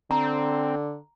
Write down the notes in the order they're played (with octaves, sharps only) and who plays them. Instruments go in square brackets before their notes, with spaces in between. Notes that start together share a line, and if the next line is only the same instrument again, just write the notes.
[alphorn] D3 [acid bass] C4 [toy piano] A#5